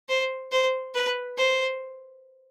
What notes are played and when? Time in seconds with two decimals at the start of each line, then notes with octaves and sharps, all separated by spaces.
0.09 C5
0.52 C5
0.94 B4
1.38 C5